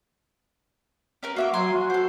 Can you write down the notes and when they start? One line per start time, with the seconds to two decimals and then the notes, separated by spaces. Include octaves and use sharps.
1.23 C#4 A#4 B4
1.36 A#3 F#4 E5 C#6
1.54 F#3 G#5 A#5 C6
1.72 F#4
1.90 A4 C5